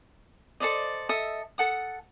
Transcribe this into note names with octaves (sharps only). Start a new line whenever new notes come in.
A4 C5 D5 D#5
A4 D#5 E5 D#6
A4 F#5 D#6